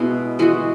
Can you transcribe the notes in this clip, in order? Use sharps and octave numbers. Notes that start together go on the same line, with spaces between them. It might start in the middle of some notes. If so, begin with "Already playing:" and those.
Already playing: B2 G#3 B3 E4
E3 G#3 B3 F#4